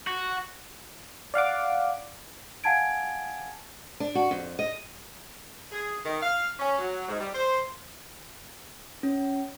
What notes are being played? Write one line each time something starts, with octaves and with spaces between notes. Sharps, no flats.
F#4
D5 F5 F#5 D6
F5 F#5 G#5 A5 G#6 D7
D4
F#4
F2
D#5
G#4
D#3
F5
C#4
F#3
G#2
G3
C5
C#4